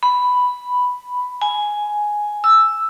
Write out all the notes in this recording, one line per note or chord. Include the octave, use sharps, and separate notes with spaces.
B5
G#5
E6